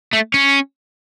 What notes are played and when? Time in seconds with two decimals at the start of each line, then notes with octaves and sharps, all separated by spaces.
0.13 A3
0.34 C#4